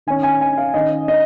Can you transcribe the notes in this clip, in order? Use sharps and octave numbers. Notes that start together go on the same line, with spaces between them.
D#3 C#4 G#5
G#5
G#5
F5
D#3 C#4 D#5
D#5